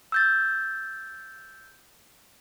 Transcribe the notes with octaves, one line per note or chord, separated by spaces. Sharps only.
E6 G6 A6